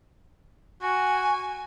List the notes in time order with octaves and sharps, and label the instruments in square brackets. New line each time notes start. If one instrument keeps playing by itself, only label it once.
[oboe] F#4 [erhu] G#5